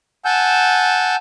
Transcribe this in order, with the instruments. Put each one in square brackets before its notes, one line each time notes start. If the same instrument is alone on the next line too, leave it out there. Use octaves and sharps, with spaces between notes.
[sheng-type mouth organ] F#5 G#5 A5 E6 G6